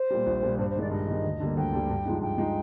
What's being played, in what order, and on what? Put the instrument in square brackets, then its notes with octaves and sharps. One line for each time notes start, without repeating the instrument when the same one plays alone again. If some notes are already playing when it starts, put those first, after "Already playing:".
Already playing: [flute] C5
[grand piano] A#2 G3
A#1
A#2 G3
[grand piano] G2 [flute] C5
[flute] C5
[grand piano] D#3 G#3 [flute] D5
[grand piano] G2 [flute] D#5
[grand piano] D#3 G#3
D2
D3 G3 A#3
[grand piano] D2 [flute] G5
[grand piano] D3 G3 A#3
G2
F3 G#3 D#4
[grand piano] G2 [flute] G5
[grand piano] F3 G#3 D#4